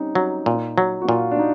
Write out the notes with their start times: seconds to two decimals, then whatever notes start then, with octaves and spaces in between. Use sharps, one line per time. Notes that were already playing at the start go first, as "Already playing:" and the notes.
Already playing: G3 C4 C#4 D#4
0.15 F#3
0.46 A#2
0.78 F#3
1.01 F#4
1.08 A#2 F4
1.31 D4
1.39 D#4